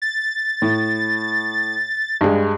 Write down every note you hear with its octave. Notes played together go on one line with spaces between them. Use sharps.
A6
A2
G2 G#3